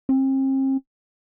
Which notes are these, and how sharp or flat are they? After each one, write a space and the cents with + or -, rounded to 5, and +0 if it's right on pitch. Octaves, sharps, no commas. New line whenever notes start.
C4 +40